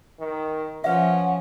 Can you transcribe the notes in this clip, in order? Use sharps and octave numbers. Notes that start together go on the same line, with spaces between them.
D#3
F3 C#4 B4 E5 F#5